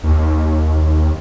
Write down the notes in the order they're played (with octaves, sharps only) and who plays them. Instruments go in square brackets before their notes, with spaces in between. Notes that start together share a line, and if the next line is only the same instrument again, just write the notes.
[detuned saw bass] D#2